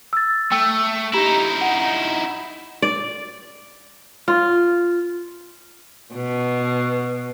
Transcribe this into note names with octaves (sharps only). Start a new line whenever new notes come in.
E6 A6
A3 G5 E6
D#4 E4 G4 A#5 E7
F#5
D5
F4
B2